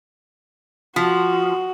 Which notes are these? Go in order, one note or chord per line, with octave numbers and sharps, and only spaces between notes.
F3 F#4